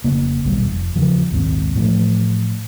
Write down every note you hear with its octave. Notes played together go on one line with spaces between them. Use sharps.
F1 C#3 A#3
A#1 D#2 B2 G3
F1
E2 C#3 F3
A#1 D#2 G#2 C4
A2 E3 F3 A3